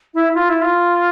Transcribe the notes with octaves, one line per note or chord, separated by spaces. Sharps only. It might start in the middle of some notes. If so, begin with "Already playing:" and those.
E4
F4
E4
F4